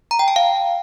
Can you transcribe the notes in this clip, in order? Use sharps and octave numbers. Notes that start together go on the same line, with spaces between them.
A#5
G5
A5
F5